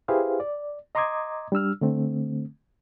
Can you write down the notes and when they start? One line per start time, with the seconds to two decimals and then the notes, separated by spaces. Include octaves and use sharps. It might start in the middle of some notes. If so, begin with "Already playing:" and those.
0.08 E4 G4 G#4 B4 C5 F5
0.40 D5
0.95 D#5 A#5 C6 D6 D#6 G#6
1.52 G3 D4 E6 F6
1.81 D3 A3 C4